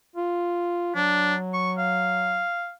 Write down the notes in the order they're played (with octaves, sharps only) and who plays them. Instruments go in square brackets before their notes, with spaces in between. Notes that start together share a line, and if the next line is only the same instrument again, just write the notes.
[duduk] F4
[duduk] F#3 [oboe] D4
[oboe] C#6
F5